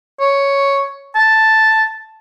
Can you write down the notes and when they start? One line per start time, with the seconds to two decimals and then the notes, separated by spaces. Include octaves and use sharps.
0.20 C#5
1.15 A5